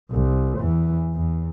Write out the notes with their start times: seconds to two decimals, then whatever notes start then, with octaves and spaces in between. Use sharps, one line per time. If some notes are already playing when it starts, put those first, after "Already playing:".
0.11 C2
0.59 E2 E3
1.14 E2